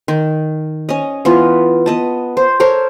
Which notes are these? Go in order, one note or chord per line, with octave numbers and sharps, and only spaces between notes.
D#3
C#4 D#5
E3 B3 F4
B3 D#5 A5
C5
A4 A#4 C5 C#5